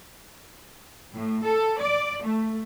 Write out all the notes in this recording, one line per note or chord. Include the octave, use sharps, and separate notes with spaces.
A2
A4
D5
A3